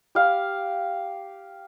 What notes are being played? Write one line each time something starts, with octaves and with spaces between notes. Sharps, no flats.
G4 F5